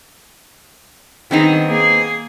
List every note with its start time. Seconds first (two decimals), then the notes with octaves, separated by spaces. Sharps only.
1.31 D#3 B3 C4 D#4 G#4
1.67 A#3 G#4